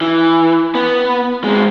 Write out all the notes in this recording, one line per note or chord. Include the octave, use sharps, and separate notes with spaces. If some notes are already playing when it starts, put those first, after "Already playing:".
E3
B3
G#3 C4